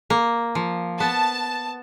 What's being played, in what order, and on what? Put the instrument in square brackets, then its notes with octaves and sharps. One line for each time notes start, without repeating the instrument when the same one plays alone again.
[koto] A#3
F3
[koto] B3 [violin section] A5